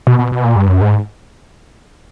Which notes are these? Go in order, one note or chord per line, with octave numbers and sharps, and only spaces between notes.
B2
B2
B2
A#2
G2
F#2
G#2